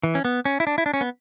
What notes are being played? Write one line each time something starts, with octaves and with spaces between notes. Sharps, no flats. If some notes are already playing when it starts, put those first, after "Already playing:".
E3
C#4
B3
C#4
E4
D4
E4
D4
C#4
B3